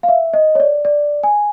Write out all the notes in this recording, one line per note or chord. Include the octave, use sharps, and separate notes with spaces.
F5
E5
D#5
C#5
D5
D5
G#5